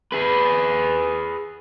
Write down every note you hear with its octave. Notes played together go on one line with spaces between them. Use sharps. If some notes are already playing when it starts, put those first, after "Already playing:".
G#4 B4